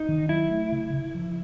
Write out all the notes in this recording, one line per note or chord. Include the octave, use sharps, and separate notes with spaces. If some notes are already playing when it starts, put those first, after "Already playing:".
Already playing: D#4
D#3
F#3 E4
A3
C#3
C#3
F3